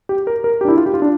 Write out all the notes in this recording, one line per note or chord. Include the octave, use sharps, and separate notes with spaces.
G4
A#4
A#4
G4
D4
E4
F4
G4
F4
D4